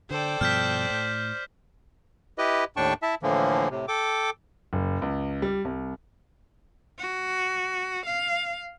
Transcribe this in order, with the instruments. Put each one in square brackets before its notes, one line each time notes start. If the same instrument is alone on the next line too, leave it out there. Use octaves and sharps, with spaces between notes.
[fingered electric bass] D3 [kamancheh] A4 G5 [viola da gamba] C5 D5
[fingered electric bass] G2 B2 F3 [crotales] F6 G6 B6
[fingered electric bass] A2
[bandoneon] E4 G4 B4 D#5
D#2 A2 D4 G5 A5 C#6
E4 E5 A5
A2 D3 E3 F3 A#3
A2 C3
A4 G5 D6
[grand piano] F#1
C#2
G3
C2
[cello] F#4
F5